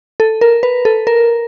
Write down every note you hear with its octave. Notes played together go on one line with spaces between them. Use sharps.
A4
A#4
B4
A4
A#4